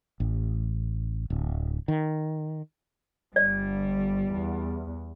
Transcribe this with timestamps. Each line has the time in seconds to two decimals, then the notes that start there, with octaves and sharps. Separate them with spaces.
0.20 A1
1.30 D1
1.88 D#3
3.36 G1 G3 D5
4.33 E2